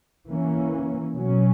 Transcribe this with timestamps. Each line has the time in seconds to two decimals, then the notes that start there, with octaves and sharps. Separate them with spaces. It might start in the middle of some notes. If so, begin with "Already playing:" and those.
0.27 E3 A#3 C#4
1.14 B2 F#3 C#4